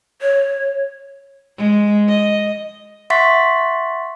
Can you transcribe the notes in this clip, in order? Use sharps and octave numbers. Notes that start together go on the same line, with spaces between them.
C#5
G#3
D#5
E5 F#5 C6 C#6 A6 B6